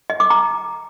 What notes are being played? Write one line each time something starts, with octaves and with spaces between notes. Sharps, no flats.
D#5
D6
A#5